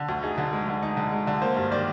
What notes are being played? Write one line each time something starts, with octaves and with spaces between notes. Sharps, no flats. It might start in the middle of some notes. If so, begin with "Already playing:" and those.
Already playing: D3
D2
D#4 G#4
D3
G#3
D3
D#4
D3
G#3
D3
A#3 C5
G2
D#3 D5